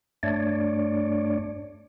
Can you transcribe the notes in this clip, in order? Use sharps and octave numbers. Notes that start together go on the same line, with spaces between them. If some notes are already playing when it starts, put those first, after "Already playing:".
G2 A3 D4 C#5 D5